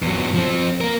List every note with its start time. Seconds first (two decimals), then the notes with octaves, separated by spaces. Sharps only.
0.02 E2 F#3
0.34 F3 C4
0.81 A#3 A#4